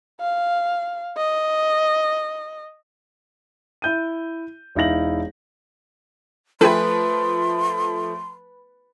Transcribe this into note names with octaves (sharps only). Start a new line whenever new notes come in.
F5
D#5
E4 G6 D#7
E1 D#4 E4 F5 A#6 F#7
F3 A3 A4 B4 G5 G#5 C6